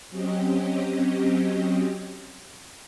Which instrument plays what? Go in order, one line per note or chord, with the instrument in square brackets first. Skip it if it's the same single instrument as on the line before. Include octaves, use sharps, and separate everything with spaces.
[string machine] F#3 C4 C#4 G4 D#5